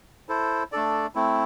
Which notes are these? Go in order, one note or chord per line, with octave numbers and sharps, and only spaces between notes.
E4 A4 C5
A3 D4 A4 D5
A3 C4 E4